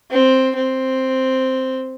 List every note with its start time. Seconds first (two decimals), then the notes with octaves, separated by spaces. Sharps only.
0.11 C4
0.55 C4